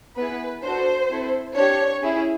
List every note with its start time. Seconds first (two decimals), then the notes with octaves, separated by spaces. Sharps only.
0.17 B3 E4 G#4 B4
0.63 D4 F#4 A4 C5
1.10 C4 E4 A4
1.56 D4 G4 C#5
2.03 C#4 E4 G#4